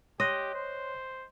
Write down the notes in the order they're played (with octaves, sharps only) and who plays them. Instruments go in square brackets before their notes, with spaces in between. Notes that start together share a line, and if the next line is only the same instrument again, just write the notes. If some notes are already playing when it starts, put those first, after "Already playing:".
[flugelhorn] G4 [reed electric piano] C#5 C6 F#6 [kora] D#5
[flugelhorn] C5